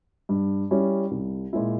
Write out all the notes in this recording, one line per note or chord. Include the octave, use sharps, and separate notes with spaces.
G2
G3 C#4 E4
C2
A#2 G#3 E4